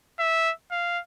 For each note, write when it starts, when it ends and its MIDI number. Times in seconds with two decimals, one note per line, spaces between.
0.19 0.52 76
0.71 1.00 77